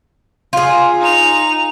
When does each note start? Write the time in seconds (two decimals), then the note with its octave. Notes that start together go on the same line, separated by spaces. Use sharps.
0.53 F4 G#4
1.01 D#4 F7